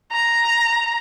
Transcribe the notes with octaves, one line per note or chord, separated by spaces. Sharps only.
A#5